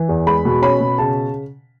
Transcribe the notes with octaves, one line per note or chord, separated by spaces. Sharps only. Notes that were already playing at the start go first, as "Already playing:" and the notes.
Already playing: E3
E2
G#3 B5
B2
C#4 B5
B2
C#3 A5